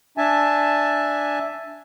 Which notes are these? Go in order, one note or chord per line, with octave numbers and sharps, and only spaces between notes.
D4 E5 G#5 A5